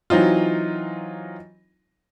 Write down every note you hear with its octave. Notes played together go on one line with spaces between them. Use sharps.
E3 F#3 C4 D#4 F4